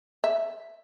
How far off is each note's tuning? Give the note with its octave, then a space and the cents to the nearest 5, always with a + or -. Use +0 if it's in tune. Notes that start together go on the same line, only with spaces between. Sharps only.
E5 +5